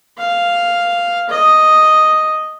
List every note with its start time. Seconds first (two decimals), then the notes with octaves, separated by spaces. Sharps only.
0.18 F5
1.29 D#5